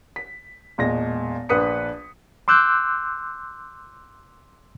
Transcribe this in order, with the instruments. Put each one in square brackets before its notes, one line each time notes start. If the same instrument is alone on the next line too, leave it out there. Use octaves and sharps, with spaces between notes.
[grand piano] B6
E1 A#2 G#3 A#6
A#1 D4 B4 D#6 B6 C#7
[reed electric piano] C6 D6 E6 F#6 G6